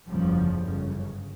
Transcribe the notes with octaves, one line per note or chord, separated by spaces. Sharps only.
F#1 E2 C#3 F3 G3
G1 F#2 C#3